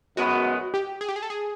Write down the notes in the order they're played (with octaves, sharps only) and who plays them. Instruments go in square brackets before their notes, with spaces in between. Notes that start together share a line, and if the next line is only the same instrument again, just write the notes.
[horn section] F#2 D#3 G#3 B3 [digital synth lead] F#4
[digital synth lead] G4
G#4
G4
G#4
A4
G#4